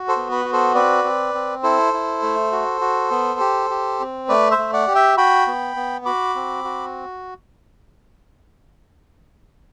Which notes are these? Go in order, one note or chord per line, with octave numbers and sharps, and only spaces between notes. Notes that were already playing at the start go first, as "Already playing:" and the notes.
Already playing: F#4
A4 C5
B3
B4
F#4
A4 C5
C4 B4 D5
C4
C4
E4 A4 C5
E4
A3
F#4
F#4
B3
G4
G4
C4
A3 B4 D5
C5 E5
A3
D5 F#5
G4
E5 G5
F#4 G5 B5
B3
B3
F#4 B5 D6
C4
F#4